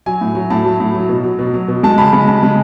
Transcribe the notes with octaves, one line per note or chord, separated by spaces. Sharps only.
F#3 G#5
A2
F#3
A2 A5
F#3
A2
F#3
B2
F#3
B2
F#3
B2
G#3 A5
C#3 B5
G#3 B5
C#3 A5
G#3